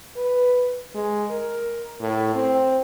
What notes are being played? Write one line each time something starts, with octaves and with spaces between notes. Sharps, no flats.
B4
G#3
A#4
A2
C4